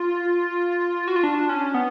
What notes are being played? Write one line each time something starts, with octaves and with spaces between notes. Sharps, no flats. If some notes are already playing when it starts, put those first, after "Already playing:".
Already playing: F4
F#4
F4
D4
C#4
B3